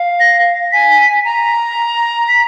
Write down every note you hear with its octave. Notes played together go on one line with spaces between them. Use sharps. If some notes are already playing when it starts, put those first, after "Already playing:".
Already playing: F5
A#6
G#5 B6
A#5
B6